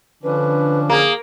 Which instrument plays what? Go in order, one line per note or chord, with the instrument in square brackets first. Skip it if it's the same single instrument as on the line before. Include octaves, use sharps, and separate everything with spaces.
[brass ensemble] D3 [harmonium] F3 C#4 D4 [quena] B4
[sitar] A#3 [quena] G#4